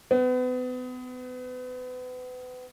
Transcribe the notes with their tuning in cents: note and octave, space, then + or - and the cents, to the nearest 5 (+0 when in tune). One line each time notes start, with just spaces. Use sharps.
B3 +35